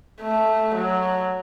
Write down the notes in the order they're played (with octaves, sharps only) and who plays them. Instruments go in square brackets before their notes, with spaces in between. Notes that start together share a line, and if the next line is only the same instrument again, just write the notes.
[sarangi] A3
F#3